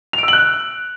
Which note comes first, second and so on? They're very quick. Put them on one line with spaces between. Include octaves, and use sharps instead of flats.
F7 D7 E6 F#7 F#6